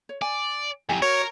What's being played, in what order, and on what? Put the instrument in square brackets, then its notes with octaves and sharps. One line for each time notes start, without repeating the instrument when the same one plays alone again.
[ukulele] C#5
[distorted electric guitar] D5 [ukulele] G#5
[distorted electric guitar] F2 F#3 [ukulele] E4 G4 G#5
[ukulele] F#4 [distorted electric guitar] A#4 [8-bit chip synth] C#5